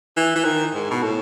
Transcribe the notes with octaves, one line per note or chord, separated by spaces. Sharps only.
E3
E3
D#3
G#2
B2
A2